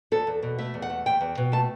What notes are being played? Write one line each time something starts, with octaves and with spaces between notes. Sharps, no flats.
E2 A4
E2
B2
A3 E5
E2
F#5
A3
E2 G5
E2
B2
A3 A5